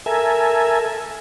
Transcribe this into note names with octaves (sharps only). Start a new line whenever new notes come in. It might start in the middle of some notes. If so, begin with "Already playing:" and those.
A4 A#4 E5 G#5